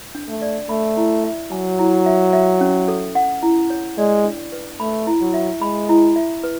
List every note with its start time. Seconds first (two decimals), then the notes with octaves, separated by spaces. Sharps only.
0.15 D4
0.28 A3
0.42 D5
0.69 A3 B5
0.97 E4
1.24 E5
1.52 F#3 G#5
1.79 E4
2.06 E5
2.33 E5
2.61 C#4
2.88 A4
3.15 F#5
3.43 E4
3.70 C#5
3.98 G#3 D5
4.25 D4
4.52 B4
4.80 A3 B5
5.07 E4
5.21 F#3
5.34 E5
5.61 G#3 B5
5.89 E4
6.16 E5
6.44 B4